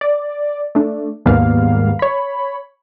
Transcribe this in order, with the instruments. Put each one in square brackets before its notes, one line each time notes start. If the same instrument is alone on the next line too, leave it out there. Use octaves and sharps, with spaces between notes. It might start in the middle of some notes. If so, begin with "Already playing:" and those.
[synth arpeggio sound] D5
A3 D4
D#2 G#2 G3 A#3 B3 F5
C#5 B5